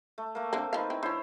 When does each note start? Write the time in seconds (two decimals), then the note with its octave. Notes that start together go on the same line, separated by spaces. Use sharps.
0.18 A3
0.35 A3 A#3
0.53 D3 A#3 C4
0.73 F3 D#4 B4 F5
0.90 C4 E4
1.03 D3 F3 E4 C5 C#5